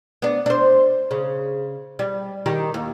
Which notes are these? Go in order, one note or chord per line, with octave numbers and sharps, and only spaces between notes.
B3 D4
D4 C5
C#3
G3
D#3 D#4 G4
D#2